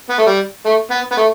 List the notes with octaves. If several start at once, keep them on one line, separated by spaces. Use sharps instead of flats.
B3
A3
G3
A3
B3
B3
A3